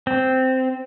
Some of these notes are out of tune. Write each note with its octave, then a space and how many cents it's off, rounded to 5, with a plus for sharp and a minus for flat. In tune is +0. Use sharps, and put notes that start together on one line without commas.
C4 -10